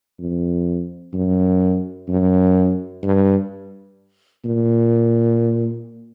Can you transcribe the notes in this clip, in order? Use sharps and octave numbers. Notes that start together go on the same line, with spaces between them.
F2
F#2
F#2
G2
A#2